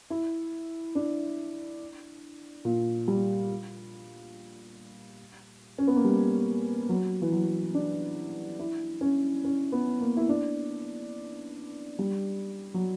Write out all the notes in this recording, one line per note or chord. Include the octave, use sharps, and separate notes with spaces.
E4
D4
A#2
G3
C#4
B3
A#3
G3
F#3
E3
F#3
D4
E4
C#4
C#4
B3
A#3
E4
D4
G3
F#3